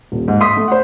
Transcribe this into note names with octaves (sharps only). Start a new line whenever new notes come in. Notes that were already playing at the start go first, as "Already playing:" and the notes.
D#1
G#2
C6 D#6 B6
A3
C5 F#5